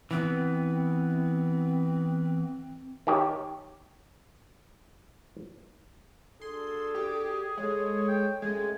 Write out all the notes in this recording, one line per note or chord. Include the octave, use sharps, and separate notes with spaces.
E3 B3 C4
D#3 G4 C#5
D4 F#4 G#4 A4 C6
G4
G#3 A4 C#5
G5
F#2 G#3 A3 G#5